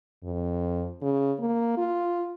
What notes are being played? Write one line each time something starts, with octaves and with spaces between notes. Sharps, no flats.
F2
C#3
A#3
F4